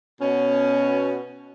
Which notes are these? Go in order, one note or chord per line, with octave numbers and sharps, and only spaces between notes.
B2 C#4